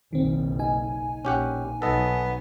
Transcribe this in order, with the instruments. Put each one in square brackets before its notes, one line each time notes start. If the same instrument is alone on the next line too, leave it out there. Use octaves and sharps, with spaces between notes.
[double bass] F#1 B1 [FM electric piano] D#3 C4
[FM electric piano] D#4 G#5
[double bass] A#1 [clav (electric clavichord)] C#4 G4 F#5
[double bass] B1 F#3 [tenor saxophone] B3 [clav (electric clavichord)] A4 D#5